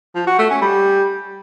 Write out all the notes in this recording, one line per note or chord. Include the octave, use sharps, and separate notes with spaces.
F3
F#4
A3
C#4
G3